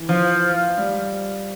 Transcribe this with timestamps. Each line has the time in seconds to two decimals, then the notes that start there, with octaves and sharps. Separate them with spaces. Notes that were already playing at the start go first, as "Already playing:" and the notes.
Already playing: E3
0.09 F3
0.78 G3